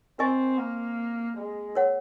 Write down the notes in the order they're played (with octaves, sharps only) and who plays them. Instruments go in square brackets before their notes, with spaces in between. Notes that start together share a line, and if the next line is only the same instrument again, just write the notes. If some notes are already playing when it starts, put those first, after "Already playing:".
[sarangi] C4 [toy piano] A#4 D#5 G#5 C#6
[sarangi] A#3
G#3
[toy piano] A#4 C#5 F#5